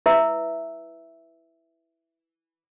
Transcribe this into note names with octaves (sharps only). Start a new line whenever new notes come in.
E4 B4 E5 E6